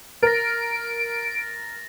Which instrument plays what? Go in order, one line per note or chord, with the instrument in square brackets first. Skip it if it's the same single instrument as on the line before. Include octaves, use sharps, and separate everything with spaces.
[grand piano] A#4 [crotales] A6 A#6 [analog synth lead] D7